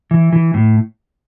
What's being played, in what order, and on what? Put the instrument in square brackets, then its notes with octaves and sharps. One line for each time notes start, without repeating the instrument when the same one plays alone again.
[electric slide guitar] E3
E3
A2